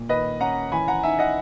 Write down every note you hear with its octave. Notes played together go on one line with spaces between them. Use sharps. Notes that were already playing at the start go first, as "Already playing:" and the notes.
Already playing: A#2
D#3 B4 D#5
C#4 F#5 A#5
E3 G#5 B5
F#5 A#5
D#4 E5 G#5
D#5 F#5